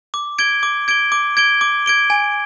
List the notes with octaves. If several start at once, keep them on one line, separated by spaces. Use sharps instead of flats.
D6
G#6 D7 G7
D6
G#6 D7 G7
D6
G#6 D7 G7
D6
G#6 D7 G7
G#5